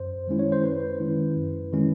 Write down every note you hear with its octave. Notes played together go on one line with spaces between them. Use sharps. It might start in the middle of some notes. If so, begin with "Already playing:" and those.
Already playing: F#2 C5
D#3 G#3 C#4 E4
C#5
C5
F#2 B4
D#3 G#3 C#4 E4
F#2
D#3 G#3 C#4 E4